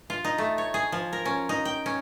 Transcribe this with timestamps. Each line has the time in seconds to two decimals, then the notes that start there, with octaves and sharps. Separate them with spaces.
0.10 F4
0.24 D#4
0.38 A3
0.58 C#5
0.74 G#4
0.92 F3
1.13 A#4
1.25 C#4
1.49 D#4
1.65 G5
1.86 C#4